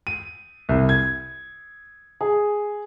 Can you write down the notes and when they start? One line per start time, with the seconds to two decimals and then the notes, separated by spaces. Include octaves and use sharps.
0.07 D#7
0.69 C2
0.89 G#6
2.21 G#4